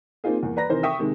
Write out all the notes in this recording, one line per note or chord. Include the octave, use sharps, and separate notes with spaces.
A#3 C4 D#4 F4 G#4
E2 A#3
B4 D5 A#5 A#6
C3 D#3 E3 D#4 A#4 C5
E5 G5 C#6 D#6
C3 D#3 G#3